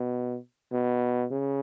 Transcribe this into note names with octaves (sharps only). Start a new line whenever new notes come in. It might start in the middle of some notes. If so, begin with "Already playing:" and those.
Already playing: B2
B2
C#3